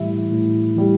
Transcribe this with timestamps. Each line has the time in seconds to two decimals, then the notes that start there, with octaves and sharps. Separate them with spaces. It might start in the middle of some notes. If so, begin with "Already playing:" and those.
Already playing: A2 E3 G3 E4 E5
0.31 A2
0.75 E3 G3